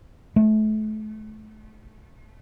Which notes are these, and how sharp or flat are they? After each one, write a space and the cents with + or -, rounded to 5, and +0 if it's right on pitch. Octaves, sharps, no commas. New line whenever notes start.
A3 -35